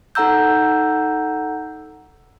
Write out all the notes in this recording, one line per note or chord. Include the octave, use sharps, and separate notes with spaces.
D#4 A4 F#5 A#5 E6 G6